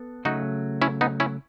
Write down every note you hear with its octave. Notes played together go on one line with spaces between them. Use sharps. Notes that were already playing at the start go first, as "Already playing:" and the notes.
Already playing: B3 A4
C#3 F#3 A3 D#4 F#4
C#4 E4
B3 D#4
C#4 E4